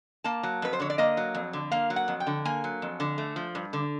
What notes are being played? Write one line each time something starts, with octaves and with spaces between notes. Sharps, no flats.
A#3 A5
F#3
F2 B4
C5
D3 C#5
D5
A#3 D#5
F#3
F2
D3
A#3 F5
F#3
F#5
F2
G5
D3
A#3 G#5
F#3
F2
D3
A3
F3
G2
D3